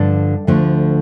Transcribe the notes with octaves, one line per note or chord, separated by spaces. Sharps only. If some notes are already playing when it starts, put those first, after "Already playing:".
Already playing: G2 D3 F3 A4 D5
D2 D3 F3 A3